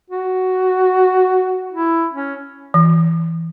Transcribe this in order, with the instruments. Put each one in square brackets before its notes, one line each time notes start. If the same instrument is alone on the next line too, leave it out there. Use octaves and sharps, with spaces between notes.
[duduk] F#4
E4
C#4
[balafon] E3